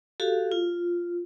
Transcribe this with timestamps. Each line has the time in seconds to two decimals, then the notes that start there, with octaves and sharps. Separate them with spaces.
0.20 F#4 G4 A4 F5
0.52 F4